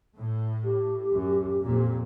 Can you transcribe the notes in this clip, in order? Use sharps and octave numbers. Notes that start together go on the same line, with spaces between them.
A2
G4
F#2
F2 A#2